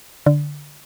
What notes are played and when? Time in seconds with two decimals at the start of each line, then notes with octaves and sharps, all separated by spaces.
0.26 D3